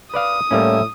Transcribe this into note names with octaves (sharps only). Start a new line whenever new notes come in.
B4 D5 F5 D#6
A2 G3 A#3 C#4 E4